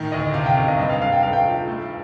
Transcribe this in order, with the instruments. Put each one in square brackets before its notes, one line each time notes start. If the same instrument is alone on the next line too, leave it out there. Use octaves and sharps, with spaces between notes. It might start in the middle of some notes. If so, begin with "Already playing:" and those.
Already playing: [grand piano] A2 D#3
[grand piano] D2 [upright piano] D#5
[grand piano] C3 [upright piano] F5
[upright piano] G5
[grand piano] C3 [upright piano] F5
[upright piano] D#5
[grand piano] G2 [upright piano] D#5
[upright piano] F5
[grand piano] G2 [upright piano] F5
[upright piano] G5
[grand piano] G2 [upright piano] F5
[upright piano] G5
[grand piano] F3
A3